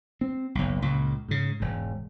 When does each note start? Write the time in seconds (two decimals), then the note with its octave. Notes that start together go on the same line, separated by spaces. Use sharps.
0.21 C4
0.55 F#1 B1
0.82 C#2 A#2 C#3
1.29 G#2 C#3
1.60 E1 G#2